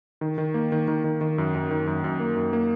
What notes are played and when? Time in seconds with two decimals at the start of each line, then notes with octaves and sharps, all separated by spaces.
0.21 D#3
0.38 D#3
0.54 A#3
0.72 D#3
0.88 D#3
1.04 D#3
1.21 D#3
1.38 F#2
1.55 F#2
1.71 D#3
1.87 F#2
2.04 F#2
2.20 A#3
2.36 F#2
2.53 A#3